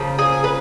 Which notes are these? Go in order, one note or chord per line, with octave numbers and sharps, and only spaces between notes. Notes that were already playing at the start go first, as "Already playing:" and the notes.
Already playing: C#3 F3 A#3
G#4
B4